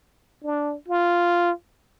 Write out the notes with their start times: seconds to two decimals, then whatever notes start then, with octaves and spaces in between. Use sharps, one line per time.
0.44 D4
0.88 F4